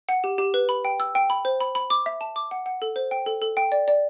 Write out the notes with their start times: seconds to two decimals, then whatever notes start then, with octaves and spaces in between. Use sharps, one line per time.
0.09 F#5
0.24 G4
0.38 G4
0.54 B4
0.69 B5
0.85 G5
1.00 E6
1.15 G5
1.30 B5
1.45 C5
1.60 B5
1.75 B5
1.90 D6
2.06 E5
2.21 A5
2.36 D6
2.51 F#5
2.66 F#5
2.82 A4
2.96 C5
3.11 G5
3.26 A4
3.42 A4
3.57 G5
3.72 D5
3.88 D5